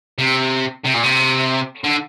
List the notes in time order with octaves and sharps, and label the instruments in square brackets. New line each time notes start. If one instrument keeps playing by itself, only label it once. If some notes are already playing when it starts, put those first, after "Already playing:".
[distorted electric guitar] C3
C3
A#2
C3
D3